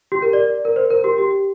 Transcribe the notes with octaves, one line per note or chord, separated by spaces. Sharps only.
G4
A#4
D5
A#4
C5
A#4
G4
G4